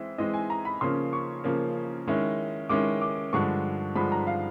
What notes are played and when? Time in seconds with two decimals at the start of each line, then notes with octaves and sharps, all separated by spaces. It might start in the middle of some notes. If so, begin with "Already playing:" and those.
Already playing: E3 G#3 C4 E5
0.18 E3 G#3 C4 D#5
0.34 G#5
0.50 A#5
0.65 B5
0.81 C#3 F3 A#3 C#4 C6
1.13 C#6
1.44 C#3 F3 A#3 C#4
2.07 D#3 G#3 C#4 E4
2.69 D#3 G#3 C#4 E4 D6
3.01 D6
3.33 G2 D3 F3 G#3 C#6
3.95 G2 D3 F3 G#3 B5
4.12 A#5
4.27 F5